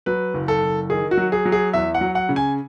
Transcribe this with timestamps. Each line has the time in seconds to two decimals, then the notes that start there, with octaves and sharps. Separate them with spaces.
0.06 F#3 B4
0.34 F#1
0.48 A4
0.62 F#1
0.90 D#3 G#4
1.11 F#4
1.17 F#3
1.32 G#4
1.45 F#3
1.52 G#4
1.73 E2 E5
1.95 F#5
2.01 F#3
2.15 F#5
2.29 C#3
2.36 G#5